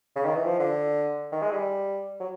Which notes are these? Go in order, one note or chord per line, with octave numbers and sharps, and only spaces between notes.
C#3
D#3
E3
F3
D3
D#3
G#3
G3
F#3